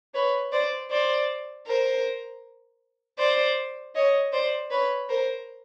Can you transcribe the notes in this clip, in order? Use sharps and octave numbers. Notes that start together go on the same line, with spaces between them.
B4 C#5
C5 D5
C5 D5
A#4 C5
C5 D5
C#5 D#5
C5 D5
B4 C#5
A#4 C5